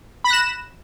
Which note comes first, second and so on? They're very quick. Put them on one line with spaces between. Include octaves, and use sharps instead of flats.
B5 A#6 F#6 E7